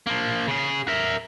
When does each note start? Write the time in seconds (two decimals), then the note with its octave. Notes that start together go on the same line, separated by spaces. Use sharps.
0.07 F3 A#3
0.48 C#3 G#4
0.88 A#4 E5